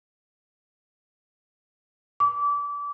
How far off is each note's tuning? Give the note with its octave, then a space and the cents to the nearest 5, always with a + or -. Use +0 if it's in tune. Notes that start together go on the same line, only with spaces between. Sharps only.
D6 -30